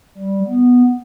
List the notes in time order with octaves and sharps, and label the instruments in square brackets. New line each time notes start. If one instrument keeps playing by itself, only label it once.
[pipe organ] G3
B3